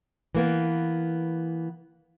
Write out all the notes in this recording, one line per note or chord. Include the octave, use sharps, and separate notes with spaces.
E3 A#3 B3